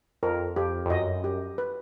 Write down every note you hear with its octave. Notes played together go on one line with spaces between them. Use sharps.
F2 A#4
F2 G4
F2
F#2 D#5
G4
B4